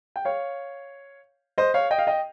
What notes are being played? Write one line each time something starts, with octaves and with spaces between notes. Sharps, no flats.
G5
C#5 F5
C5 D#5
C#5 F5
D#5 G5
F5
D#5 G5